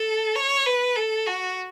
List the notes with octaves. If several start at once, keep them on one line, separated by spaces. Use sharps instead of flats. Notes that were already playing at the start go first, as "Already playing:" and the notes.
Already playing: A4
C#5
B4
A4
F#4